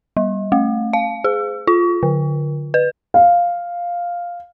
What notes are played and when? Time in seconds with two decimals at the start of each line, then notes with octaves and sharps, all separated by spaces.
0.17 G3
0.52 A3
0.93 F5
1.24 G#4
1.67 F4
2.03 D3
2.74 B4
3.14 F5